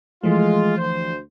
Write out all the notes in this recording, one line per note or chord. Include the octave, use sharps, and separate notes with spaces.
E3 F3 G#3 A3 F4
D2 C5